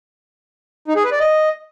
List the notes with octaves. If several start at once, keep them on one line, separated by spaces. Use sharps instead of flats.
D#4
G#4
B4
D5
D#5